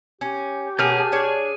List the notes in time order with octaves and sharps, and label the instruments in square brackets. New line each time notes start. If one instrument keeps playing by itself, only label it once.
[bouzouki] C#4 [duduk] G4
[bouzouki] B2 C#4 A#4 [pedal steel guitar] G#4 F6 G6 [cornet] A5
[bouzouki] D4 C#5 D5